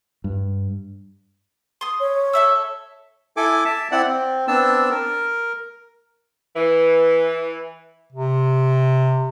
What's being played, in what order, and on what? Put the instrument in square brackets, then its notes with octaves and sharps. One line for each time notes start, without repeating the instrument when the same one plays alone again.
[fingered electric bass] G2
[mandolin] C6 D#6
[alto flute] C#5
[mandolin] A4 E5 E6
[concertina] E4 A4 G#5 D6
E5 A5
C4 E4 D5 F#5
C4
B3 C4 D4 A5 E6
A#4
[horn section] E3
[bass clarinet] C3